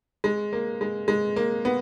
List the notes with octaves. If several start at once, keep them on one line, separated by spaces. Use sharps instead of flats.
G#3
A#3
G#3
G#3
A#3
B3